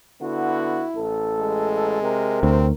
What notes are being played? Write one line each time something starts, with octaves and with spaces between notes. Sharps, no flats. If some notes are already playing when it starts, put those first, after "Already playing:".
D3 B3 E4 F#4
A1 A4
G#3
C3 A#4
D2 C4